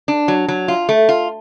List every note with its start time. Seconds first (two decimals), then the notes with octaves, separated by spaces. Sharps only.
0.08 D4
0.28 F#3
0.48 F#3
0.68 F4
0.89 A3
1.09 F4